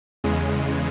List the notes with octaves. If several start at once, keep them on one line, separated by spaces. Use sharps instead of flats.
E2 C#3 G#3